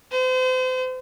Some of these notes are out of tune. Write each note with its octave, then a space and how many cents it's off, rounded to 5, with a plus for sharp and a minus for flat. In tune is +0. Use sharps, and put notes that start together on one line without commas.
C5 -35